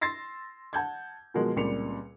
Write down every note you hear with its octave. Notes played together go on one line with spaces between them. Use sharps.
C6 E6 A6 A#6 C7
F#5 A5 G6 G#6
B2 D#3 F3 F#3 G#3 A#3
C#2 A#2 G3 C4 C#7 F7